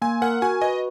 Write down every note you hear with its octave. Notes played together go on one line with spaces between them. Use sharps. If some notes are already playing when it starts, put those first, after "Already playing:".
A#3 G#5
A#4 F#5
F#4 G#5
B4 D#5